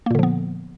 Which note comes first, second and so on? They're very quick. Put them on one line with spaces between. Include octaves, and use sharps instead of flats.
A#3 A#2 D3 F3 B3